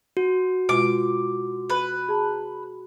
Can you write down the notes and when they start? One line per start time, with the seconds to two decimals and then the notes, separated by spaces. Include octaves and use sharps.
0.17 F#4
0.69 B2 G#3 F4 D6
1.70 B4
2.09 G#4 A5 A#5